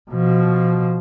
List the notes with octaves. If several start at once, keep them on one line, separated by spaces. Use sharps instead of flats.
B2 F3